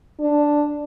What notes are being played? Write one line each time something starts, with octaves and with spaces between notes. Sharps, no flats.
D4